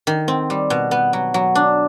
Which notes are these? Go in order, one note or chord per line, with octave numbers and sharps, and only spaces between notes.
D#3
C4
G3
B2
B3
F#3
F#3
D4